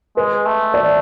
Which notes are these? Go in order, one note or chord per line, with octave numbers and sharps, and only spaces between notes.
G#3 B4
A3
D5